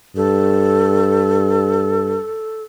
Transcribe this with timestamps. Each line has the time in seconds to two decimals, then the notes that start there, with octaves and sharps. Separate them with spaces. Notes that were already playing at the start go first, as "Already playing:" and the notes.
0.16 G2 A4